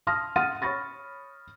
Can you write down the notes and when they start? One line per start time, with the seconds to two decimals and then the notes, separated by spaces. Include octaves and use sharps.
0.07 F5 A5 C6 D#6 F6 A#6
0.36 F#5 C6 D#6 F6 A6 D#7
0.62 C#5 B5 C#6 A6 A#6